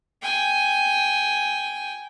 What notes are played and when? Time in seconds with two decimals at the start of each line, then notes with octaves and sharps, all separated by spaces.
0.22 G5 G#5